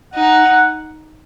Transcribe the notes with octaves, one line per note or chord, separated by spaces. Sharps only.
D#4 F#5